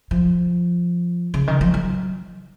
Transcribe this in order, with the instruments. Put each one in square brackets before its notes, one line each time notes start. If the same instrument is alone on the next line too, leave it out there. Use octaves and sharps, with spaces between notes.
[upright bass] F3
C#3
D#3
F3
F#3